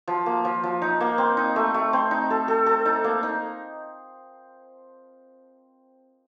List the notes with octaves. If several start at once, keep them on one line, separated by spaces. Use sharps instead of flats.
F3
A#3
F3
F3
D#4
A#3
C4
D#4
A3
A3
C4
D#4
A4
A4
A4
D#4
A#3
D#4